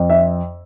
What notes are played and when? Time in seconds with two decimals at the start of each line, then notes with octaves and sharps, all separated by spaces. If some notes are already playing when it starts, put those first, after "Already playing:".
Already playing: F2
0.10 E5